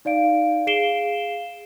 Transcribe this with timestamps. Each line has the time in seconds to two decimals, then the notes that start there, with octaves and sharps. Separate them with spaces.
0.05 D#4 D5 F5 D7
0.67 G#4 F5 C7 D7 E7 G7